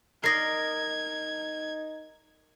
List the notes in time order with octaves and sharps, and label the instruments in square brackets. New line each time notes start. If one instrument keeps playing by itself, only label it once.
[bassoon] D#4 [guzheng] A#4 D5 D#5 [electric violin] G#6 [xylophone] A#6 C7